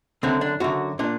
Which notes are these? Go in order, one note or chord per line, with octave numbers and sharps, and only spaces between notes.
F#2 D3 C4
D4
F#2 D3 F#4
A#2 D4